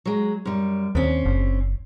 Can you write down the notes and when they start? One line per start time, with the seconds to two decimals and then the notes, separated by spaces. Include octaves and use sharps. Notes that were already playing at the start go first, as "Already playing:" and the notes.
0.05 F#3 G#3
0.45 F#2 G3
0.95 D#2 C4 C#4
1.26 F#1